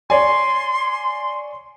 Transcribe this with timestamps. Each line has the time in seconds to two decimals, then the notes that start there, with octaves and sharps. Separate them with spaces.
0.10 C#5 D5 G#5 C6